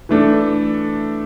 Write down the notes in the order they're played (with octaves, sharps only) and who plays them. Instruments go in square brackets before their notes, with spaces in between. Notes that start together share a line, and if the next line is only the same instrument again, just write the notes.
[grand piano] E3 A3 D4 A4